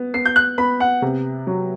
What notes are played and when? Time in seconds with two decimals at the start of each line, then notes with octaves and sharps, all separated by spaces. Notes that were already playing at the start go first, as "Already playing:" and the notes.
Already playing: B3
0.14 B3 C7
0.26 G6
0.36 F#6
0.58 B3 B5
0.80 F#5
1.02 C3
1.47 F#3